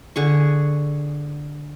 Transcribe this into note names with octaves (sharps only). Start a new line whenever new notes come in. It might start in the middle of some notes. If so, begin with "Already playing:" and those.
D3 G#4 C#6